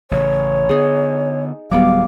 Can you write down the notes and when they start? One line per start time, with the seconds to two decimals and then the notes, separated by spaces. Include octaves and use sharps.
0.11 A1 C#3 C#5
0.69 D3 B3 D#4 G#4
1.71 D1 F#3 G3 B3 F5 D6